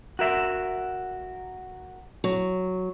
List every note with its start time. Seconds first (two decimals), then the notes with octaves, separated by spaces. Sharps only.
0.19 F#4 A#4 E5
2.24 F#3